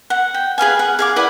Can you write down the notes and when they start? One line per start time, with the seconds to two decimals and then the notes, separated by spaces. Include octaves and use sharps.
0.10 F#5
0.34 G5
0.58 G#4 B4 F5 G#5
0.79 F#5
0.99 G#4 F5 D6
1.16 E4 B4 D5 F#5